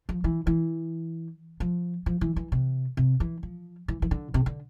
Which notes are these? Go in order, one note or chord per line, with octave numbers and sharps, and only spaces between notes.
F3
E3
E3
F3
F3
E3
E3
C3
C3
E3
F3
E3
E3
D3
C3
D3